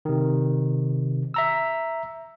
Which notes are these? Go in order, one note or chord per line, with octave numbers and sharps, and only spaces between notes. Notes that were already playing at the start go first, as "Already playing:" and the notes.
C3 D#3
E5 A#5 E6